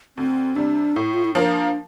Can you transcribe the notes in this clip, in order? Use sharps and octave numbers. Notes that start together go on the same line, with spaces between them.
D2 C4
C3 G3 D4
A2 E4
F4
E4
F3 A#3 D4 F4 A#4